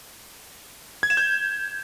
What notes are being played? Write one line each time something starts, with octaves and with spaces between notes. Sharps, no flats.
G#6
E7
G6